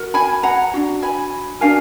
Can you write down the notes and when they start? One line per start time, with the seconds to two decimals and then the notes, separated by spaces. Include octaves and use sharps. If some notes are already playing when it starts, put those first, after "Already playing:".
Already playing: F#4 A#4
0.14 G#5 B5
0.43 F#5 A#5
0.74 D4 F#4
1.03 G#5 B5
1.61 D4 F#4 A#4 F5 G#5